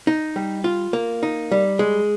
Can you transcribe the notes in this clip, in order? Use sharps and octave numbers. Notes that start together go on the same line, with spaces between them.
D#4
G3
F4
A#3
D#4
G3
G#3